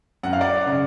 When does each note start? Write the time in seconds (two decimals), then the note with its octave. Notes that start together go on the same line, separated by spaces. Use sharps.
0.23 F#2 F#5
0.33 F5
0.41 D5 F#5
0.67 C#3